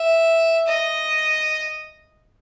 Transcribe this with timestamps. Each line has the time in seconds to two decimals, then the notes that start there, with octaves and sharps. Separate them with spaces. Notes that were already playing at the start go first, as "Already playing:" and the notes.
Already playing: E5
0.67 D#5